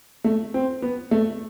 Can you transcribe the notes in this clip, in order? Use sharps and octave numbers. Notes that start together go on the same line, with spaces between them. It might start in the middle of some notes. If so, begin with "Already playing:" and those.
A3
C4
B3
A3